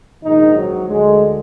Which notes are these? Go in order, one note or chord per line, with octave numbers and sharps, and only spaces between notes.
A#1 G#2 D#3 D#4
F#3
D2 D3 G#3